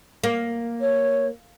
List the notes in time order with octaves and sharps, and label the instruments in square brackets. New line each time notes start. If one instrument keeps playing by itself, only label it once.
[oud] A#3
[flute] C#5